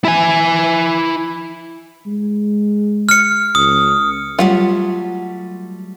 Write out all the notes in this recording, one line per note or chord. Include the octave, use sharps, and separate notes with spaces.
E4 G#5
G#3
F6 C#7
C#2 D#6
F#3 G3 A3 F4 F#5